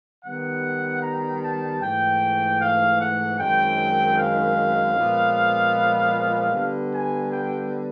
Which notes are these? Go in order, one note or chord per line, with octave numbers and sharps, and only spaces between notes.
D#3 G3 B3 F#5
A#5
A5
G#2 E3 A3 G5
F5
F#5
F#2 D#3 G#3 C4 G5
F5
A#2 F3 G#3 B3
D3 G3 B3
G#5
G5